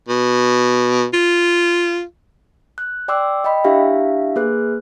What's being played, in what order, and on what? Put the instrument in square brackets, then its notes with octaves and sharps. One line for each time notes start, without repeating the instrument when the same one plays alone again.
[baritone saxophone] B2
F4
[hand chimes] F#6
D5 G5 C6 D6 E6
D#5 G5 B5
D4 E4 G4 E5 F5
A#3 G#4 B4 F#6